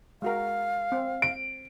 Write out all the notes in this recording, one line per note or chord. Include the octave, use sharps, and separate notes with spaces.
G#3 F#4 A#4 F5
C4
D7